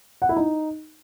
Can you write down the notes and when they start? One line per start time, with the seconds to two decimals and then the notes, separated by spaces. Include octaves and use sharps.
0.22 F#5
0.29 E4
0.37 D#4